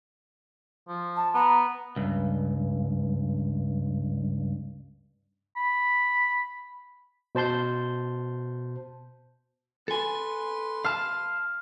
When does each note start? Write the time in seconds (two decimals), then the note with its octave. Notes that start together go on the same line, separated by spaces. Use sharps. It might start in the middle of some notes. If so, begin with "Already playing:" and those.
0.88 F3
1.16 A5
1.34 B3 A#5
1.96 C#2 G2
5.56 B5
7.35 B2 C5 A5 C6 G6
9.88 A4 B4 G#5 C6
10.85 F5 A5 F6